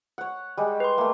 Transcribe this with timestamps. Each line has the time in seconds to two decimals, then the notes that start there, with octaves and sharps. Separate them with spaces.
0.18 C#5 F#5
0.57 G3 G#3
0.80 B4 C6
0.98 A3 A#3